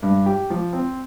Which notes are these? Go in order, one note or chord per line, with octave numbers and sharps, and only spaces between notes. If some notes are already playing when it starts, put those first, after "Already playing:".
G2
G4
F3
C4